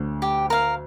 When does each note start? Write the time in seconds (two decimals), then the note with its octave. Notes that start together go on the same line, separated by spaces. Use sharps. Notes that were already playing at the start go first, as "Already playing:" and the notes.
Already playing: D2 D3
0.22 G4
0.50 A#4 F5